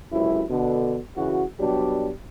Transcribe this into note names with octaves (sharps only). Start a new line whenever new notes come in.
C#2 F#2 C3 E4
B2 D3
C#3 E3 F#4
B2 F#3 G3 D4 G4